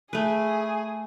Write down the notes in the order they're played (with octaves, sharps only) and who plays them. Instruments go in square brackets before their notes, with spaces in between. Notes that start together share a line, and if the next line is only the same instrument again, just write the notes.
[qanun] A3 B4 [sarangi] G#4